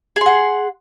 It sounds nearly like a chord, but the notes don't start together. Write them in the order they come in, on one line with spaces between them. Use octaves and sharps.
G#4 C6 F#5